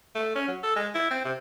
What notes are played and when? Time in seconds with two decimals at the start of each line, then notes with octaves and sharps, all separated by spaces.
0.15 A3
0.35 C#4
0.48 F#3
0.63 A4
0.76 G#3
0.95 E4
1.11 C4
1.25 C3